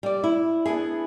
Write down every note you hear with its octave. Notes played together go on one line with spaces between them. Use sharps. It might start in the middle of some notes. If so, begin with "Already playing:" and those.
G3 D5
E4
B3 D4 E4 G#4